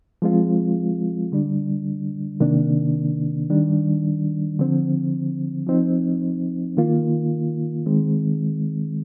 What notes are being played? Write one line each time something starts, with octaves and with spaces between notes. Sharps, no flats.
F3 G#3 C4 F4
D3 G3 D4
C3 D#3 A#3 D4
D#3 G3 D4
D3 F3 C4
F3 C4 D#4
D#3 A#3 F4
D#3 G#3 C4